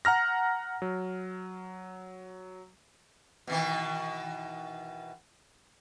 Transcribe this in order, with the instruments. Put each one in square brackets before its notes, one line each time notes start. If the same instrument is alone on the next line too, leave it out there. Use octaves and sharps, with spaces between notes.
[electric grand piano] F#5 A#5 F6 A#6
F#3
[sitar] B2 D#3 E3